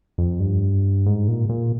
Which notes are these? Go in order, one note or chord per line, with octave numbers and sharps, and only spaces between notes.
F2
G2
G#2
A#2
A#2